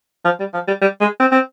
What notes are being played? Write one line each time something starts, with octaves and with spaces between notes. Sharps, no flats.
F3
G3
F3
G3
G3
G#3
C4
C4